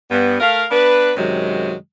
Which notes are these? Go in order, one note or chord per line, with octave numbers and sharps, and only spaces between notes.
G2 B3
A3 A#4 F5
B3 D4 B4
F#2 C3 D#3 F#3 G#3